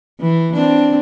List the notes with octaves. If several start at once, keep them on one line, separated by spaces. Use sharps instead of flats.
E3
C4 D4